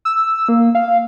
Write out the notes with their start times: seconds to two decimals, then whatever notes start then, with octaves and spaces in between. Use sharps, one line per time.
0.05 E6
0.49 A#3
0.75 F5